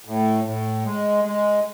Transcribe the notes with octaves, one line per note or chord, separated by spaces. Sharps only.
A2
A2
G#3
G#3